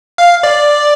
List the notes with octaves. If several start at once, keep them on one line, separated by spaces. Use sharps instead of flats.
F5
D5